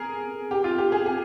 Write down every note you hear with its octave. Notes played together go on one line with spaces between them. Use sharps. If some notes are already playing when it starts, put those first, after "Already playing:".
Already playing: G#4 A#4
G4
F4
G4
G#4
G#4